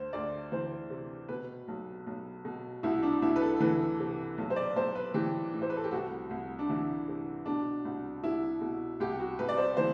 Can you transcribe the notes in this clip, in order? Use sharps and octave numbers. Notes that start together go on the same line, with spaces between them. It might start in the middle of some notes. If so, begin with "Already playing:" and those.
Already playing: D2 C5
D2 D5
E3 C5
C3
B2 B4
B1
B1
B2
C2 E4
D4
C2 E4
B4
A4
E3 B4
C3
B1
C5
D5
B1 C5
B4
E3 G4
A2
C5
B4
A4
G4
C2 F#4
C2
D4
E3 E4
C3
B2 D4
C2
C2 E4
B2
C2 G4
F#4
C2 B4
D5
C5
E3 C5